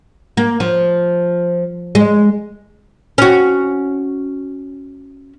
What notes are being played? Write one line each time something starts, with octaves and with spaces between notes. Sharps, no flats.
A#3
F3
G#3
C#4 F#4